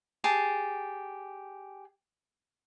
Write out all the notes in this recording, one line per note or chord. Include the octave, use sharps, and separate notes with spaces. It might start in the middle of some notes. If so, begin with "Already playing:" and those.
G4 G#4 A5